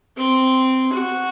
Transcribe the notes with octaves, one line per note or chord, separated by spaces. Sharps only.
C4
F#4